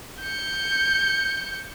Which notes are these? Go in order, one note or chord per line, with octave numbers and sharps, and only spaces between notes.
G6 C#7